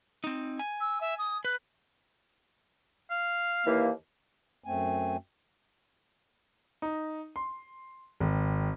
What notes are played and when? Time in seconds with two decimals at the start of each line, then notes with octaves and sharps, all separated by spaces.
0.24 C4 D#4
0.59 G#5
0.80 E6
1.01 E5
1.18 D#6
1.45 B4 F#6
3.10 F5
3.66 D#2 E3 A#3
4.64 F#2 A3 C4 G#5
6.82 D#4
7.36 C6
8.20 G#1